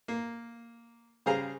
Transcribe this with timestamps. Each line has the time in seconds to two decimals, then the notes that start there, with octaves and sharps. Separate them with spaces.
0.08 A#3
1.26 C#3 G3 G#4 C5 F5 A#5